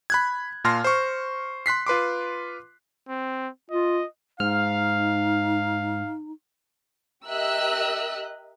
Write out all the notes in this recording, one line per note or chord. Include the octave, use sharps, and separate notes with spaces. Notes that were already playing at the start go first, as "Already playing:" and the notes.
B5 F#6 G#6
A#2 F4 A5 C6 F6 A#6
C5 C#6
C6 F#6 B6 C7
F4 B4 C6 D6
C4
F4 D#5
G#2 D#4 F5 F6
G4 A#4 D#5 E5 E6 F#6